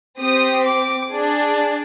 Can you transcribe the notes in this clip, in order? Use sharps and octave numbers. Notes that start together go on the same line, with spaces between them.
C4 G4 D#6
D6
D4 G#4